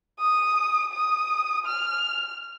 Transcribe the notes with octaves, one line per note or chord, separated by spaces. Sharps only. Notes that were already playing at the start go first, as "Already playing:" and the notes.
D#6
D#6
F6